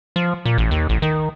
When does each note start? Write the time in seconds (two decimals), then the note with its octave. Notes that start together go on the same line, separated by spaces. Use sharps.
0.16 F3
0.45 A#2
0.58 A1
0.71 D#2
0.89 A1
1.02 D#3